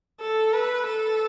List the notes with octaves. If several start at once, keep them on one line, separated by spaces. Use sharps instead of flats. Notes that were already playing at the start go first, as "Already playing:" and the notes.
A4
B4
A4